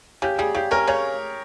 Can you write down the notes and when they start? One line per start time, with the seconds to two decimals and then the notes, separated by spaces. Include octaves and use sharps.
0.22 C#3 G4
0.38 G3 G#4
0.55 C#3 G4
0.71 C#4 A#4
0.87 C#3 C#5